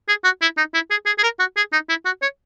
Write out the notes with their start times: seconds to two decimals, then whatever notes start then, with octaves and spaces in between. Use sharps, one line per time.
0.08 G#4
0.24 F#4
0.42 E4
0.57 D#4
0.74 E4
0.91 G#4
1.06 G#4
1.18 G#4
1.23 A#4
1.39 F#4
1.57 G#4
1.73 D#4
1.89 E4
2.05 F#4
2.22 C#5